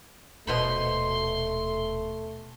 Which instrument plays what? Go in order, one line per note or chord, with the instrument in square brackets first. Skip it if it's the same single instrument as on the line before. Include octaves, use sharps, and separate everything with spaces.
[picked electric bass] D#1 [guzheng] B2 C5 B5 [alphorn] A3 [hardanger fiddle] C6